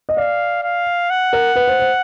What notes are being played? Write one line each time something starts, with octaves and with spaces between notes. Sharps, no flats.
D#5
D5 F5
F5
F#5
A#4
B4
C5
C5